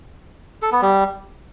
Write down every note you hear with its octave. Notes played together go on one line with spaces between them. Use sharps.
A4
B3
G3